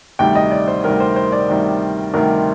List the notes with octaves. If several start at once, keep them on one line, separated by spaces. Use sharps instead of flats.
D2 C3 D#3 G3 G5
D#5
D5
C5
D2 C3 D#3 G3 A#4
C5
C5
D5
D2 C3 D#3 G3
D2 C3 D#3 G3 A#4